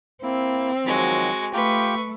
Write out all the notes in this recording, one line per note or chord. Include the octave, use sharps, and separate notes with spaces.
A#3 C4 E4
D#3 F3 F#3 G#3 F#4
A3 F4 G4 B4 G5 C#6